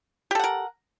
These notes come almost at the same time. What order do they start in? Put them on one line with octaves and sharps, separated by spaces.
G4 A4 F#5 A#4